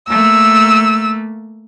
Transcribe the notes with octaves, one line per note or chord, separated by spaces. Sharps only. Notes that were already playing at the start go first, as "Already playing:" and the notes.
A3 A#3 E6